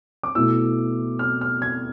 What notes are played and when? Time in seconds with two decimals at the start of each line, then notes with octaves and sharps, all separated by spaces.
0.23 D6
0.35 B2 A3 E4 E6
1.19 F6
1.41 F6
1.62 G#6